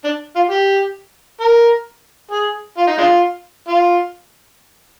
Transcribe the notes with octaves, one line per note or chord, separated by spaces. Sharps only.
D4
F4
G4
A#4
G#4
F4
D#4
G#3 D4 F4
F4